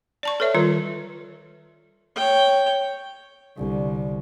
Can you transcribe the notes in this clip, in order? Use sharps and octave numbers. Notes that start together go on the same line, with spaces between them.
D5 A5 C#6
A4 B4 C#5 E5
D#3 G3 F4 B4
C#5 G5
C2 D3